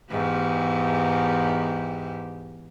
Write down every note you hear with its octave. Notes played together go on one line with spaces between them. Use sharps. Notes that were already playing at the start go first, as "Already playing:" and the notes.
E2 G#2 G4